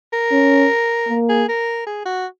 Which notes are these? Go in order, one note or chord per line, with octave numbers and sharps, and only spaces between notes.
A#4
C#4
A#3
G#4
A#4
G#4
F#4